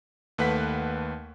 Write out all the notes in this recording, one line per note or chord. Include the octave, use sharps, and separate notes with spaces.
D#2 A3 B4 F#5 B6